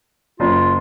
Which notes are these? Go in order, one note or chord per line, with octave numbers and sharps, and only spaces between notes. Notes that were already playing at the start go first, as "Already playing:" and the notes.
F#1 F4